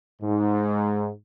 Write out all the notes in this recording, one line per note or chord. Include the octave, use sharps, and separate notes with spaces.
G#2